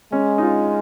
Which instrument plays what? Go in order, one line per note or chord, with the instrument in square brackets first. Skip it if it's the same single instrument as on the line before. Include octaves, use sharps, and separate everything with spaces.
[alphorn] G#3 [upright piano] C#4
[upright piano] D#4
F4